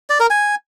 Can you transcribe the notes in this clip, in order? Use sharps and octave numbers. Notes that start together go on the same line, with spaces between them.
D5
A#4
G#5